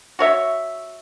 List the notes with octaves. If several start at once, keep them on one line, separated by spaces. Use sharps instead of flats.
F#4 C#5 E5